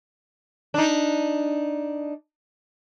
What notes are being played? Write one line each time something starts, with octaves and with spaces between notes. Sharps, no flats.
D4 D#4